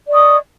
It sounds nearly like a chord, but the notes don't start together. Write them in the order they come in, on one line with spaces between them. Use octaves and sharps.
D5 D#5 C#6 D#6